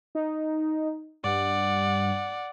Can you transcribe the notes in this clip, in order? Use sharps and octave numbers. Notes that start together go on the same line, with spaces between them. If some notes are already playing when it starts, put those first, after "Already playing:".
D#4
G2 D5 F#5